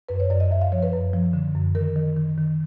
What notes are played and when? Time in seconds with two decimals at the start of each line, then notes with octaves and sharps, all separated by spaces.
0.09 F#2 B4
0.20 C#5
0.30 F#2 D5
0.40 D#5
0.51 F#2 E5
0.61 F5
0.72 F3 C#5
0.83 B4
0.93 F#2
1.14 F3
1.33 D3
1.55 F#2
1.75 D#3 A#4
1.96 D#3
2.17 D#3
2.38 D#3